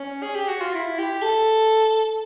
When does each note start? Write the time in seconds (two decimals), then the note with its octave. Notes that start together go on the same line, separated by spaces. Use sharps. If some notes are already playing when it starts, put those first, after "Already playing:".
Already playing: C#4
0.22 G#4
0.35 G4
0.48 F#4
0.61 F4
0.74 E4
0.98 G4
1.22 A4